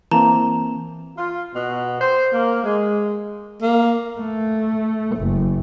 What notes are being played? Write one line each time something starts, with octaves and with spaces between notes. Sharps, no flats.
E3 A#3 C4 A5 A#5
F4
B2
C5
A#3
G#3
A#3
A3
F#1